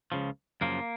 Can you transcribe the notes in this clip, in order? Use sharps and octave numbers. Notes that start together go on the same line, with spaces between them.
C#2 C#3 F3
F#2 C#3 F3 A#3